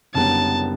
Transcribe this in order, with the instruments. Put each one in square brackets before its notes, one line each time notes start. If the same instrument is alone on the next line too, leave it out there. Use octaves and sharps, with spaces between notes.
[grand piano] F#1 F#2 D3 G3 B3 [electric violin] A5